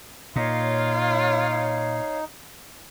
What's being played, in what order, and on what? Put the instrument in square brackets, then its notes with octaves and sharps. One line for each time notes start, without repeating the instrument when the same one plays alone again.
[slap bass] A#2 [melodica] D#4 [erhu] F4 [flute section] C#5 F5